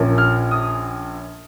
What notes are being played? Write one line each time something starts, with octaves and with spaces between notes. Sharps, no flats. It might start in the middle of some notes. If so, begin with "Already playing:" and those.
Already playing: A#1 A#2 A#3 C#4
F6
D#6